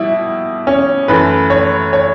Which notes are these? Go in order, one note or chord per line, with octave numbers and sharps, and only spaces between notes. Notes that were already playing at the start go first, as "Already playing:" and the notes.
Already playing: B2 G3 E4
C#4
F#2 E3 A3 B4
C#5
C#5